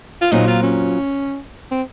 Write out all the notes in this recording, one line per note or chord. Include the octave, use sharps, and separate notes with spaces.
F4
A#2 F#3 C4 D#4
F4
C#4
C4